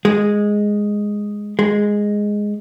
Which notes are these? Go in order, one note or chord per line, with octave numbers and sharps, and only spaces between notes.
G#3
G#3